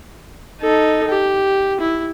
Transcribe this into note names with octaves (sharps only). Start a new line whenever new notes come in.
D#4 A4
G4
E4